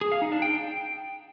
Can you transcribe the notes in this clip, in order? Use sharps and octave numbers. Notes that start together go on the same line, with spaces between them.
G#4
F5
D#4
D4
G5